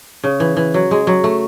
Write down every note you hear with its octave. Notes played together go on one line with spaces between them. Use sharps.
C#3
E3
E3
F#3
G#3
F#3
A3